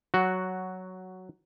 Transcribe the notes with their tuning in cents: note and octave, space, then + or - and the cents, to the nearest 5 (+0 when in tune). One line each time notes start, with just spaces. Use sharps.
F#3 +5 F#4 +0